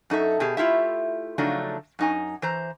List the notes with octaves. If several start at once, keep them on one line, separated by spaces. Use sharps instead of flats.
F#2 D#4 A4 E5
B2 G4 G#4
A3 E4 F4 G4 E5
C#3 F3 F#3 A3 D4 D#4
F#2 D#4 G#5
E3 C5 A#5